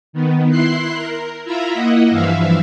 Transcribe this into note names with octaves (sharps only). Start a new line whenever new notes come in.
D#3 B3
E4 C6 F#6 C7
A#4
E4 F4 E5 A#5 B5
A#3 E4 D#5 F#5
G2 E3 F3 E5 F5